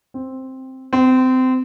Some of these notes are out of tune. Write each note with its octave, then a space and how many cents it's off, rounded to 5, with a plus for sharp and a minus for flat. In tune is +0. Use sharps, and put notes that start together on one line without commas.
C4 +5
C4 -25